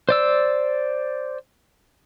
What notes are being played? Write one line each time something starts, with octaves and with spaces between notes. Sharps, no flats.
C5 D5 E6